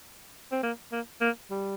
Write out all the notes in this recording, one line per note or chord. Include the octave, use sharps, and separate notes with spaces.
C4
A#3
A#3
A#3
G3